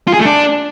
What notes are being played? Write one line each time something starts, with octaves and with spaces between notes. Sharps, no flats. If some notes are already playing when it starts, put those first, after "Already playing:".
F4
G#4
A3
D4